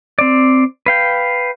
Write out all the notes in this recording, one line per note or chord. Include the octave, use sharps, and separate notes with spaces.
C4 D5
B4 F5 G5